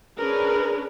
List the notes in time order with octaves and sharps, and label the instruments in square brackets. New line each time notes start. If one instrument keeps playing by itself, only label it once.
[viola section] C#4 D4 G#4 A#4 B4